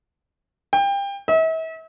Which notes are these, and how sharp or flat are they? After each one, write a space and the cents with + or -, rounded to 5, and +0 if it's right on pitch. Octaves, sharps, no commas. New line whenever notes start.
G5 +25
E5 -40